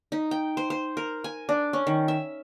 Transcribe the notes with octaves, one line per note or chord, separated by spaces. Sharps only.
D#4
G5
C5
C5
A#4
G#5
D4
C#4
D#3
E5